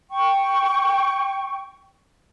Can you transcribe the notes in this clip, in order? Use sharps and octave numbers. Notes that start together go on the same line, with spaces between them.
G5 C#6